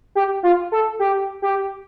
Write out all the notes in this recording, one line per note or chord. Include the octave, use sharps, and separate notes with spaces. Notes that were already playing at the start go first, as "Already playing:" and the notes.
G4
F4
A4
G4
G4